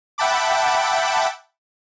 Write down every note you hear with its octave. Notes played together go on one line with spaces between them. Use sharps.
E5 F#5 G5 A5 B5 D6